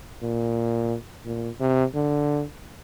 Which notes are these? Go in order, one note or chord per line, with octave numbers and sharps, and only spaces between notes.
A#2
A#2
C3
D3